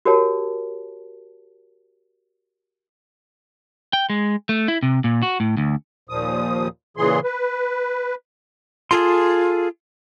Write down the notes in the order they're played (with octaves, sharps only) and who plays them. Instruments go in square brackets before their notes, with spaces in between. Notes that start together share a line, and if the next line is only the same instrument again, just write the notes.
[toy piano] F#4 G4 A#4 C#5 A5
[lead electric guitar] G5
G#3
A3
E4
C3
A#2
F#4
A2
D2
[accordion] D#2 A#2 F3 D#6
A#2 C#3 E3 G#4 C6
B4
[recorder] F4 [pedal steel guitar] G#4 A4 C6